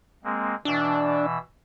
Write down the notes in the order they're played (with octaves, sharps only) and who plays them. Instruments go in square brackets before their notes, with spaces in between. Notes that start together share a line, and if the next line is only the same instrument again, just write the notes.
[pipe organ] G#3 A#3 C4
[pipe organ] B2 E3 E6 [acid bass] D4